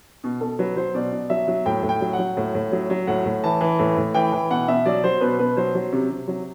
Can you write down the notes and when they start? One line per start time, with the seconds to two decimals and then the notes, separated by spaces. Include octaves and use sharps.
0.24 B2
0.41 B2 A4
0.59 F#3 B4
0.77 F#3 C5
0.94 B2 D5
1.12 B2
1.30 F#3 E5
1.48 F#3
1.66 A2 G5
1.83 A2
1.89 G5
2.01 F#3
2.13 F#5
2.19 F#3
2.37 A2
2.55 A2
2.72 F#3
2.90 F#3
3.07 A2 F#5
3.25 A2
3.44 E3 A5
3.61 E3
3.79 A2
3.97 A2
4.14 E3 G5
4.33 E3
4.50 B2 F#5
4.68 B2 E5
4.85 F#3 D5
5.04 F#3 C5
5.21 B2 B4
5.39 B2 B4
5.57 F#3 C5
5.75 F#3
5.93 C3
6.10 C3
6.28 F#3